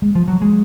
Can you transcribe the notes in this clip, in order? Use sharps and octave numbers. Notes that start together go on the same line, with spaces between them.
G#3
F3
F#3
G#3